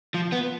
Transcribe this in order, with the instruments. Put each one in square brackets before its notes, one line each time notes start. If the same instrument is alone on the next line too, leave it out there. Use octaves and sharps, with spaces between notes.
[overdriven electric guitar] F3
B3